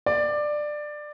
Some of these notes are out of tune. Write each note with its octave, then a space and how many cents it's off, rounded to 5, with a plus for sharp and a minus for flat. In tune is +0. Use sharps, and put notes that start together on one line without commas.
D5 +15